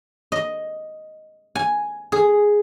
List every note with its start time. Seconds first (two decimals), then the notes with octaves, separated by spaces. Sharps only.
0.32 D#5
1.55 G#5
2.12 G#4